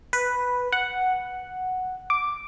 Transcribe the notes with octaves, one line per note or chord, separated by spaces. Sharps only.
B4
F#5
D6